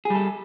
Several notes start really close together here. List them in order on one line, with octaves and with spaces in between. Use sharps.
G#4 G3 A4